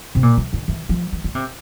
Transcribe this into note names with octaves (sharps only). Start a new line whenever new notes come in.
C3
A#2
E3
D3
E3
F3
E3
D3
C3